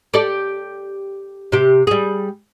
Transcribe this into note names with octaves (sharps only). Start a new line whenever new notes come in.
G4 A4 D5
C3 G4
G3 G#4